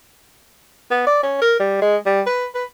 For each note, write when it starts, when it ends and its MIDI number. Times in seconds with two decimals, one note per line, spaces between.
0.91 1.06 59
1.07 1.18 74
1.23 1.37 61
1.42 1.55 70
1.59 1.82 55
1.82 1.96 56
2.06 2.21 55
2.27 2.46 71
2.54 2.65 71